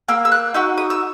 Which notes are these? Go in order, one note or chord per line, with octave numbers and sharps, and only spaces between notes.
A#3 E6
E6
F#6
D#4 F#4 E6
D#6
E6